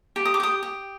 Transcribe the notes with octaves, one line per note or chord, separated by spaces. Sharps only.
G4
D#6
D6
G4 D#6
G4